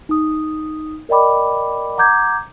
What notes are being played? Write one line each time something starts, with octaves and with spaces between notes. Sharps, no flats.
D#4 D#6
A#4 D5 D#5 G5 B5 D6
F#5 A#5 D6 G6 G#6